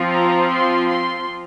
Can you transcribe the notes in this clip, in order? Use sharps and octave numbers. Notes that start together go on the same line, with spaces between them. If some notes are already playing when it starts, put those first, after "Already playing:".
Already playing: F3 C4 F4
A#5
C6
C6